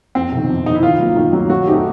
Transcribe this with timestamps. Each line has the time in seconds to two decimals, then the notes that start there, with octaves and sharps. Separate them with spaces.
0.15 F2 C4
0.32 C3 D#3
0.49 F2
0.66 C3 D#4
0.70 D#3
0.75 E4
0.82 D#3 F4
1.00 F#3 A#3
1.16 D#3
1.33 F#3 A#3
1.50 F#3 F#4
1.68 A3 C4 D#4 G4